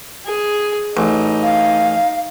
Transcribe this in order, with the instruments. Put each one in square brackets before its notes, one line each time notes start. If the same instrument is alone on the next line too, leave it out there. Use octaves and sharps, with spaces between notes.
[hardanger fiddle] G#4
[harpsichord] A1 [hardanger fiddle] D#4
[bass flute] F5